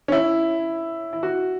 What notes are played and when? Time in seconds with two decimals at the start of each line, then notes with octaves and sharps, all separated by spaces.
0.08 C#4
0.12 E4
1.13 E4
1.23 F#4